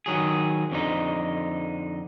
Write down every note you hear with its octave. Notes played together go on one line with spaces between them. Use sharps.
D#3 F#3 G#4
F2 D3 D#4